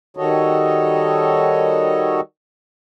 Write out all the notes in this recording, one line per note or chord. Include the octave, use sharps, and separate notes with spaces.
D#3 G3 F#4 A4 C#5 D#5